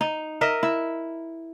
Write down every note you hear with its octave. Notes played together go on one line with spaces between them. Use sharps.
D#4
A#4 D#5 E5
E4